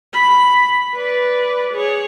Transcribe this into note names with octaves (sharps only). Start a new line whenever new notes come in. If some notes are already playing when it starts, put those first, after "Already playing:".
B5
B4 D5
G#4 C#5